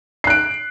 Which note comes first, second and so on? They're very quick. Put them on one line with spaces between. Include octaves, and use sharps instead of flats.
C7 F#6 D7